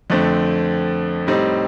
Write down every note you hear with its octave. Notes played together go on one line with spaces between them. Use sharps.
F2 D3 A3 C4
A2 G3 C4 D#4